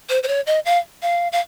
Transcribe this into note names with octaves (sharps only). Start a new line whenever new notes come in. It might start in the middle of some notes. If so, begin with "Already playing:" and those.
C5
C5
C#5
D#5
F5
F5
F5